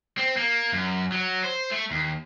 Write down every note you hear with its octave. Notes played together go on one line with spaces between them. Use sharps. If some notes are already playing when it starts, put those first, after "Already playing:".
C4
A#3
F#2
F#3
C5
A3
D#2